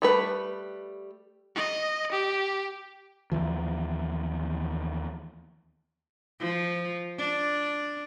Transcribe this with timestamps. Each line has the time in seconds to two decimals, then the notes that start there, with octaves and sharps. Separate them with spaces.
0.02 G3 A3 B4
1.55 D#5
2.12 G4
3.32 D#2 E3 F3
6.40 F3
7.18 D4